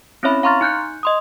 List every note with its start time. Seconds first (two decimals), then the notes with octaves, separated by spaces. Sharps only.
0.23 C4 C#4 E4 C#5 E5 B5
0.43 F5 A#5 C6 C#6 F6 A6
0.61 D#4 F#6 G6 C#7
1.03 D#5 C6 D#6